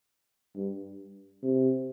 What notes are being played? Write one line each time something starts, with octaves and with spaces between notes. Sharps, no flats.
G2
C3